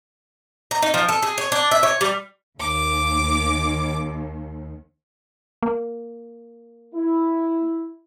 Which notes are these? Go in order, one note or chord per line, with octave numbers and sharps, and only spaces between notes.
A#5
D#4
F3
A4
G#4
C#5
D4
E5
C#5
G3
D#2 D6
A#3
E4